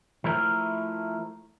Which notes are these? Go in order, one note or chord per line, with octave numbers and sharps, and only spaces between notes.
F3 A3 E4 A#4